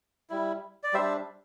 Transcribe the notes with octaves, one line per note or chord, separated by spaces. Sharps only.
G3 E4
D5
G3 D4 C5 E5